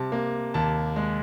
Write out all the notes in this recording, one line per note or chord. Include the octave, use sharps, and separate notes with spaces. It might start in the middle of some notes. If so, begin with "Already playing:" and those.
Already playing: C3 G3 A5
A#3
D#2 A5
G#3